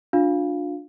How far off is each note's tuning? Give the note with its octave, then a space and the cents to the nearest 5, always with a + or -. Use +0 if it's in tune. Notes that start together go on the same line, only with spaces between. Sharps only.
D4 +0 F4 +35 F5 +0